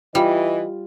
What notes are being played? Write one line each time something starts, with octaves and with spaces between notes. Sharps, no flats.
E3 G3 F4 D#5